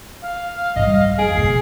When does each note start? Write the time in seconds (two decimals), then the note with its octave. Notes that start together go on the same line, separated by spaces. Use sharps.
0.22 F5
0.76 G#2 G3 D#5
1.19 F2 G#4 D7
1.35 F#1 B2 C7